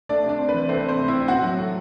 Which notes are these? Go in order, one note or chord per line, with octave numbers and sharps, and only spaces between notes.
A3 D4 D5
C3
D4 D5
C4
B4
E3
A3 C4 C5
A3 C4 C5
C3
E4 E5
C4
A2 F#4 F#5
F#3
A3